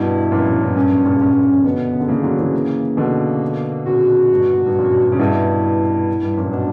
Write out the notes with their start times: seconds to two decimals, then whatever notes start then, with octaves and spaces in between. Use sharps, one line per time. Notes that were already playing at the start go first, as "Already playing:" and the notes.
Already playing: G2 B2 E4
0.32 F#2 A#2
0.46 F#2
0.62 F#2
0.75 G2 C#4
0.91 F#2 A#2
1.05 A#2 C#3
1.20 A#2 C#3 C#4
1.31 G2
1.43 G2
1.53 F#2 A#2
1.64 B2 D3 B3
1.92 C#3
2.00 D3
2.08 C#3 E3 A#3
2.23 D3 F#3
2.39 C#3 E3
2.54 A#3
2.97 B2 D3
3.86 A#2 C#3 F#4
4.31 G2 B2
4.53 A#2
4.66 G2
4.78 F#2 A#2
5.12 C#3
5.19 G2 B2 E4
6.23 G2
6.37 F#2 A#2
6.52 B2 D4